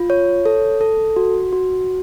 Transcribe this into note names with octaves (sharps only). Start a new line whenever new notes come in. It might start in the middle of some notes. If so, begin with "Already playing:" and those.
Already playing: F4
C#5
A4
A4
F#4
F#4